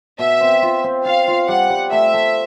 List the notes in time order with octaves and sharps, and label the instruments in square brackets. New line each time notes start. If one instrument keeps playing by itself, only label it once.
[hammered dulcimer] B2 [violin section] E5
[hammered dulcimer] C4
F4
C4
[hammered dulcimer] F4 [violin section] F5
[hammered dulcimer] F4
[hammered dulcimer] G3 [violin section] F#5
[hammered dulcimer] G3
[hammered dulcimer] A3 [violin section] E5
[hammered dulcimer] A3